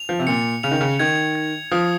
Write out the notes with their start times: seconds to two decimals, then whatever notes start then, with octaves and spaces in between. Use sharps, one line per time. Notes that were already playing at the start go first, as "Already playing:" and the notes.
Already playing: F7
0.09 F3
0.19 C3
0.27 A#2 C#7
0.63 C#3 F7
0.71 D#3
0.81 C#3
0.99 D#3 G#6
1.35 G#6
1.71 F3 D#6